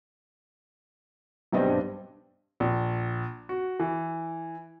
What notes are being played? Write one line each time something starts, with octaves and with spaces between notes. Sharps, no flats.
B1 G2 C4 D#5
A#1
F#4
E3